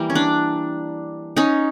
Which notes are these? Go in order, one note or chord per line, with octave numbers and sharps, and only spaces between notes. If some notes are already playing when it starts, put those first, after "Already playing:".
Already playing: E3 G3 A#3
C#4
D4
C#4 D#4